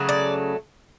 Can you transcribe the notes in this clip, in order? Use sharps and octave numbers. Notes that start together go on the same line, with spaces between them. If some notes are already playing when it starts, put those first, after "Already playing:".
Already playing: C#3 F#3 A3
D5